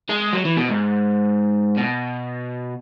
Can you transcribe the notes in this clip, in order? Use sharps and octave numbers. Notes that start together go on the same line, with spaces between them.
G#3
F#3
E3
B2
G#2
B2